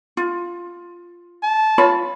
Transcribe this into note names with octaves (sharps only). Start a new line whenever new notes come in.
F4
A5
F4 C#5 B5